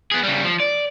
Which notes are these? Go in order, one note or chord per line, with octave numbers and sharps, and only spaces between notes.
B3 G#4
C#3 G3
F3
D5